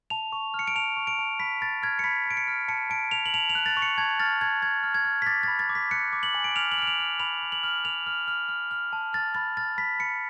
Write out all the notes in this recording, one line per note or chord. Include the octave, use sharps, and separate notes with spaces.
A5 F7
C#6
F6
C#7
D7
A5 F7
C#6
D7
A5
B5 B6
B5 A6
F6 G#6
C#7
B5 B6
B5 D7
C#7
F6
A5 C#7
A5 D7
A5 F7
F#7
A5 F7
F7
F#6
A6
C#6
C#7
A5 G#6
F6 A6
A5 G#6
A5 G#6
F6
G#6
F6
B6
D6 A6
B5 A6
A6
D6
B6
F#6 C#7
D6
F#7
G#5
D7
F6 F7
F#7
F6 D7
F7
F6
B5 F7
B5
F#7
F6
F6 F7
F6
F6
F6
F6
A5
F6 A6
B5 A6
F6 A6
B5 B6
B5 C#7